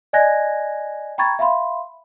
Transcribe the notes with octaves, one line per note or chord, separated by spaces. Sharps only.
D5 D#5 G#5 F#6 G#6 A#6
G5 A#5 B5 C#6 G#6 A6
E5 F5 B5 C6